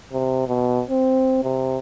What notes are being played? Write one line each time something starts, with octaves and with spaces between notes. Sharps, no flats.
C3
B2
C4
C3